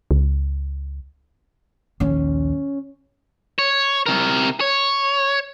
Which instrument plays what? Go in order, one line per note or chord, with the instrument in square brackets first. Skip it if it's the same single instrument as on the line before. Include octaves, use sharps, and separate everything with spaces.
[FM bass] C#2
[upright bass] A#1 D#2 [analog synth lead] C#4
[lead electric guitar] C#5
C3 A#4
C#5